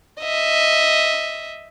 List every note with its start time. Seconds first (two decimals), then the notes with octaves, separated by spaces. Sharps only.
0.22 D#5 E5